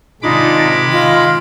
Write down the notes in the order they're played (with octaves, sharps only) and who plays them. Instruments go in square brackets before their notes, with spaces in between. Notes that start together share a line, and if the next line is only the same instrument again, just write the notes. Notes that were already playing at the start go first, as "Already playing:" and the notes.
[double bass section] C3 D#3 [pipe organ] G#3 B5 D6 [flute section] D4 D#4 F4
[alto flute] F4 [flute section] D#5